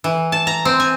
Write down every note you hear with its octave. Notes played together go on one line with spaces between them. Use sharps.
E3
A5
A#5
C4
G#5